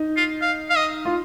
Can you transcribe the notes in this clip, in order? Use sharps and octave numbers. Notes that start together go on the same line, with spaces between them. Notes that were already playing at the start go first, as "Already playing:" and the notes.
Already playing: D#4
F4
F5
F5
D#5
F4